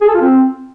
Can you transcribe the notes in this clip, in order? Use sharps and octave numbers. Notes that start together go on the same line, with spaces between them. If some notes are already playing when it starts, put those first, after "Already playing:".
G#4
A4
F4
C4